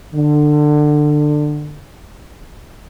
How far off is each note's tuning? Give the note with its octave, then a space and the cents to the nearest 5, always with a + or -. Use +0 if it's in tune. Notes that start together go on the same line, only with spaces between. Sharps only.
D3 +20